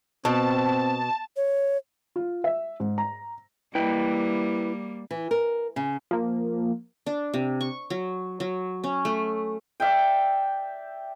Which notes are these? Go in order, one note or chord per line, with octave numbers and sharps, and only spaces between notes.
B2 C4 A5
C#5
F4
E5
G#2
A#5
G3 A#3 E4 B4 G5
E3
A#4
C#3
F3 A#3
D4
C3
C#6
F#3
F#3
C#4
A3
D5 E5 F5 G5